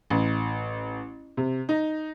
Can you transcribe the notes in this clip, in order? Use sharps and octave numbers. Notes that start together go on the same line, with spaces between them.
A1
C3
D#4